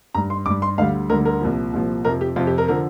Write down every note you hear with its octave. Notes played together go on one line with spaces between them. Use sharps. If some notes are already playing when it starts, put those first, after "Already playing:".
G2 G3 A#5
C6
G2 G3 D6
C6
D2 D3 G3 F5
D2 D3 G3 A#4
A#4
C2 A#2 F3
C2 A#2 F3
F2 C3 F3 A#4
G4
F2 C3 F3 F4
G4
A#4
D3 F3 A#4